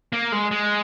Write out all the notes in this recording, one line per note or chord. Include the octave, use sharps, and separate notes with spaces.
A#3
G#3
G#3